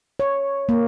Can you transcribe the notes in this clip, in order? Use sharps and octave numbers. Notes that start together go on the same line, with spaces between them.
C#5
A#3